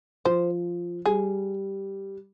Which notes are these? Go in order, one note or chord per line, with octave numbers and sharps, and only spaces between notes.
F3 C5
G3 G#4